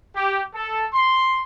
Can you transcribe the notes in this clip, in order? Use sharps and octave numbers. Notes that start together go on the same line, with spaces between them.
G4
A4
C6